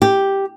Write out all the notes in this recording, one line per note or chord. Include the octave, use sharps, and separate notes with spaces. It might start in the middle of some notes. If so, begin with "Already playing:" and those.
G4